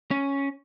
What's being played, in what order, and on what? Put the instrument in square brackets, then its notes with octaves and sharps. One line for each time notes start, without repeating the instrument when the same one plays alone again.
[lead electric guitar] C#4